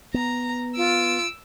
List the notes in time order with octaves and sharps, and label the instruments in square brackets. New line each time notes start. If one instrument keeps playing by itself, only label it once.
[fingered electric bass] B3 [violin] A#5
[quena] F4 [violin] E6 D7